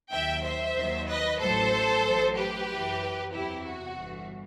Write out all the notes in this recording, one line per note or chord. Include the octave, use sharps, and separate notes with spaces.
D#2 D#3 F#3 E5 G5
C5 E5
D#2 D#3 F#3
B4 D#5
A1 A2 F#3 A4 C5
A1 A2 F#3
G4 B4
F#2 E3
E2 C3 F#3 E4 G4
F#4
G1 G2 E3